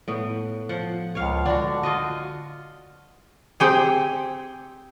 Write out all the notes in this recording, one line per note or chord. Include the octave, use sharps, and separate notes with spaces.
A2 B3
F3 F#5
C#2 C#5 F5
D3 D4 F#4
F4 F#4 D#5
C4 G4 G#4